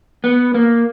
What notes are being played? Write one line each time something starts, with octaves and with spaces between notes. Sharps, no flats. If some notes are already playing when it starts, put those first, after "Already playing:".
B3
A#3